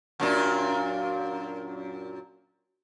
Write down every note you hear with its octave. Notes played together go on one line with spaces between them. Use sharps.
F#2 A#2 D4